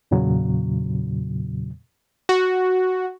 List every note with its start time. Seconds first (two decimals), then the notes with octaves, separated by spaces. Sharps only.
0.11 E2 A#2 C#3 F#3
2.29 F#4